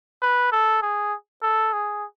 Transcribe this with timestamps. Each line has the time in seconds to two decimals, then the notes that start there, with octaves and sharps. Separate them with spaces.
0.22 B4
0.52 A4
0.82 G#4
1.42 A4
1.73 G#4